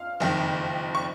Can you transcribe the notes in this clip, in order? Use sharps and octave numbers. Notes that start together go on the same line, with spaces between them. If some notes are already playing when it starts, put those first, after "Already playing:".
Already playing: F5 F6
F#1 F2 D#3
C#6